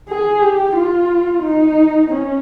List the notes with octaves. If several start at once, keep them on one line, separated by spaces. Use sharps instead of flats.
G#4
G4
F4
D#4
C#4